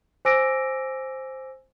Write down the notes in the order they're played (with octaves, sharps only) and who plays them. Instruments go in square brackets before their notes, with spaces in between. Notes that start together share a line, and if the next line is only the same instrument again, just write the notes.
[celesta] C5 G#5 D6 E6 A#6 D7